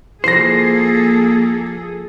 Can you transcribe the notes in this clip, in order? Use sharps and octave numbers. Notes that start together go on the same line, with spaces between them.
F3 A#3 E4 G#4 A4 C5 A#6 C7